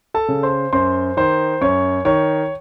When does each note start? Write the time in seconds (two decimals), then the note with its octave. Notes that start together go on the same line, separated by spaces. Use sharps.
0.14 A4 A5
0.28 C#3
0.43 C5 C6
0.73 F#2 C5 C6
1.17 D#3 C5 C6
1.61 F#2 C#5 C#6
2.05 D#3 C#5 C#6